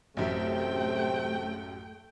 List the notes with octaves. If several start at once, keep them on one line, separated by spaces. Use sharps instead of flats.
A1 F#2 C3 A3 E5 G5